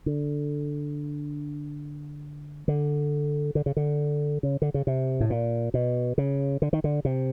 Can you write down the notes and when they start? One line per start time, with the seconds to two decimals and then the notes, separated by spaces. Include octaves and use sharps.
0.06 D3
2.68 D3
3.55 D3
3.66 C#3
3.77 D3
4.43 C#3
4.62 D3
4.74 C#3
4.87 C3
5.21 A2
5.30 A#2
5.74 B2
6.18 C#3
6.62 D3
6.73 D#3
6.84 D3
7.05 C3